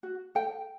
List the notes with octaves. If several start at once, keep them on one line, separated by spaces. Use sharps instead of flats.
F#4
A4 G5